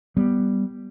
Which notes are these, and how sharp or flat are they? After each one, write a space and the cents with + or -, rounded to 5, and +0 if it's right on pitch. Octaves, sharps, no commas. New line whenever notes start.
G3 +0 B3 +0